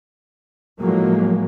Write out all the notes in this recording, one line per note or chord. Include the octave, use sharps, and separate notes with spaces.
A2 F3 F#3 G#3 A#3